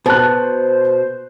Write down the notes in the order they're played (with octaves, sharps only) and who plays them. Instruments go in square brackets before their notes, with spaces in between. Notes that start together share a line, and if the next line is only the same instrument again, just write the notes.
[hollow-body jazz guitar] B2 [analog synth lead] C5 [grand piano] A5 F#6